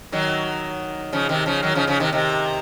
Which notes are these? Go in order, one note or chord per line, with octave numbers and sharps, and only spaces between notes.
D#3 F#3
C#3 F3
C3 D#3
C#3 F3
D#3 F#3
C#3 F3
C#3 F3
C3 D#3
C3 D#3